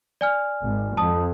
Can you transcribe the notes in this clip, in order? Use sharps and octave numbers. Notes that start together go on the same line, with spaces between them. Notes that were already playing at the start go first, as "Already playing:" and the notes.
D5 G#5 F6
G#1
F2 A5 D#6